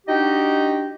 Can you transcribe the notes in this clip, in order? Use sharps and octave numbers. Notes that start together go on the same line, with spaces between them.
D4 D#4 F#4 G4 D#5 G5